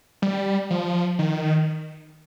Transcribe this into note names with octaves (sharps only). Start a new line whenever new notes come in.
G3
F3
D#3